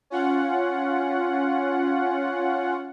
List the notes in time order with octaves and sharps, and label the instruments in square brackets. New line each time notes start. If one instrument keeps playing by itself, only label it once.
[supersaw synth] C#4 F4 F#5